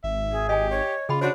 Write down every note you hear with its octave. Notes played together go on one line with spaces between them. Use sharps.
G#1 E5
G#4
G4 D#5 G#5
C#5
C#3 F4 G#4 G5 B5
D4 F#4 C5 C#5 C6